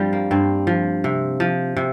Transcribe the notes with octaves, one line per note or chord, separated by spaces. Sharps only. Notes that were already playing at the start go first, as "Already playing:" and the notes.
Already playing: G2 F3 G3 C4
A#3
G2 C4
F3
C3
F3
C3